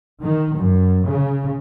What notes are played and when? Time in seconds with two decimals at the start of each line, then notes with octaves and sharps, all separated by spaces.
0.20 D#3
0.56 F#2
1.07 C#3